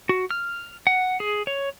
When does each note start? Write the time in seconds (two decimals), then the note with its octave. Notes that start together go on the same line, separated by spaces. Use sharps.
0.09 F#4
0.31 F6
0.87 F#5
1.20 G#4
1.47 C#5